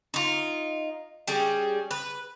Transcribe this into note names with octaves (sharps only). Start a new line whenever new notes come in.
D#4 F4
G3 C#4 G#4
B4